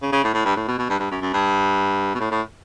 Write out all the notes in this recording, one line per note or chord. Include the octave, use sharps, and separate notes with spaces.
C#3
C#3
A2
A2
G2
A2
B2
B2
G2
G2
F#2
F#2
G2
B2
A2
A2